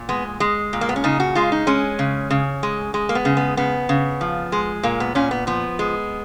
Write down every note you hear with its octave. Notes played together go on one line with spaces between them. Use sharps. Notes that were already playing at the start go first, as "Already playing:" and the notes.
Already playing: A#2
G#3 B3
G#3
A#2
A#3
B3
C#4
C#3 D#4
F#4
G#3 F4
D#4
G#3 C#4
C#3
C#3
G#3
G#3
A#3
B3
C#3
B3
C#3 B3
C#3
F3
G#3
A#2 A#3
B3
A#2 C#4
B3
F3 B3
G#3